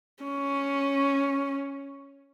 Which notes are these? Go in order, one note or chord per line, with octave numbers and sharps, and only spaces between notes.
C#4